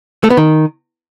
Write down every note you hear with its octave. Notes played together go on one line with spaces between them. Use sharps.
A3
B3
D#3